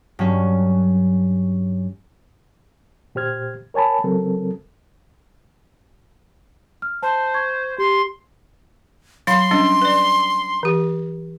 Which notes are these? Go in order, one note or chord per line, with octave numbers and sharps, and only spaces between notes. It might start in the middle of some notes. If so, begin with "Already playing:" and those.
G2 F#3 C#4
A#2 G4 C5 F6 G#6
A#4 C#5 G#5 A5 B5
C#3 F#3 C4 A4 A#4
F6
C5 A5
C#6 G#6
G4 C6
F#3 F5 B5 C6
G3 C#4 D4
B4 D5
E3 G4